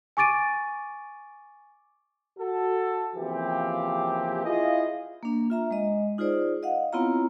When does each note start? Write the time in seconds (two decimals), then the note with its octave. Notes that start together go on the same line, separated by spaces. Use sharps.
0.17 G#5 C#6 D6 A6 D7 D#7
2.39 F#4 A4
3.16 C#3 E3 F3 A#3 C4 G4
4.45 E4 F4 G#4 D#5
5.23 A#3 D4
5.50 F4 E5 A#5
5.71 G#3 D#5
6.18 D#4 F4 G#4 C5 D5
6.63 D#5 F5 F#5
6.93 B3 C4 E4 F4 C#5 A#5